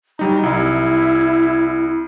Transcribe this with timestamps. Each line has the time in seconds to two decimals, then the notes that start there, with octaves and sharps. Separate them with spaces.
0.19 F#3 G3 D#4 A#5
0.43 C2 E4